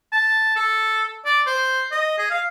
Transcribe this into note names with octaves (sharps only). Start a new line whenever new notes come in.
A5
A4
D5
C5
D#5
G#4
F5